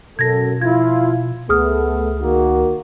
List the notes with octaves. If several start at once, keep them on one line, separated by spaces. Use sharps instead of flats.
F#2 B2 A4 G#6 A#6
F3 E4 F4 G#6
C#2 A3 B3 G#4 D#6 F6
D#3 A#3 F#4